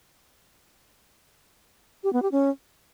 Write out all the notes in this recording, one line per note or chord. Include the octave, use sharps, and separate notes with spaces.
G4
B3
G4
C#4